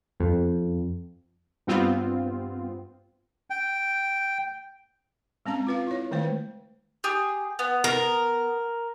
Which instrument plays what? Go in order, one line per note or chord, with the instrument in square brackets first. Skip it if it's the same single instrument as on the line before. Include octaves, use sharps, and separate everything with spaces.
[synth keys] F2
[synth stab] G2 B3 C4 F4
[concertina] G5
[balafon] G#3 C4 C#4 A#5
F4 B4 F5
E4 C#5
D#3 G#3 A3 C5
[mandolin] G4 G#4
B3
[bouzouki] A#4